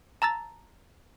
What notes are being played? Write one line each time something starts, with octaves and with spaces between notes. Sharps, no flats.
A5 A#5 E6 A6